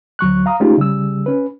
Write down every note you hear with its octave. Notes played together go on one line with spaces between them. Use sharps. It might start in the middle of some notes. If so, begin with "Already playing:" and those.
D2 F#3 C#6 F#6
F5 A#5 D#6
G#3 A3 C#4 D#4 F4 G4
C#3 G3 E6
C#4 B4